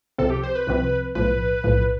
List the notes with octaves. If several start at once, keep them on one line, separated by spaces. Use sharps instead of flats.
C2 C3 F3 C4 A4
G4
C5
B4
C2 C3 F3 C4
B1 A2 F3 B4
B1 A2 F3